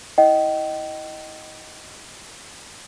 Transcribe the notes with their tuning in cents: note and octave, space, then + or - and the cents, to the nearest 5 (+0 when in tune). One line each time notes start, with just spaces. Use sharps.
E4 -25 D#5 +0 G5 -35